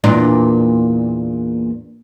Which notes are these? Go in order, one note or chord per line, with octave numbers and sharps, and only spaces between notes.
E2 A#2 D4